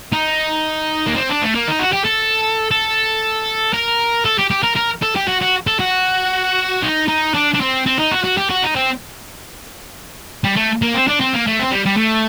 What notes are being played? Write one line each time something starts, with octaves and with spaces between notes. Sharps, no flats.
D#4
A#3
C4
D4
A3
A#3
D#4
F#4
G4
A4
A4
A#4
A4
G4
G4
A#4
A#4
A4
G4
F#4
F#4
A4
F#4
D#4
D#4
D4
D4
C4
C4
D#4
F#4
F#4
G4
F#4
D#4
C4
G3
A3
A#3
C4
D4
C4
A#3
A3
C4
G3
G3
A3